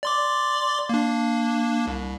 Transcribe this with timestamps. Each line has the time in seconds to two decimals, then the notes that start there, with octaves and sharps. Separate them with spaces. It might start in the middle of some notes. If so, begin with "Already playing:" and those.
0.03 D5 C6 D6
0.89 A#3 D4
1.87 C2